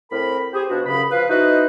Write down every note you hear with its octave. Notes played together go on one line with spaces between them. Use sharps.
A2 C4 A#4 B5
G4 G#4 C5
B2 F3 D4 F#4
F#2 C#3 B5
F3 B4 F5
D#4 E4 F#4 B4 C5 D#5